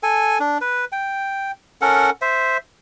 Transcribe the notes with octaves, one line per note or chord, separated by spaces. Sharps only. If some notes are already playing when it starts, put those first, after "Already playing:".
A4 G#5
D4
B4
G5
C#4 A4 A#4 F#5
C5 E5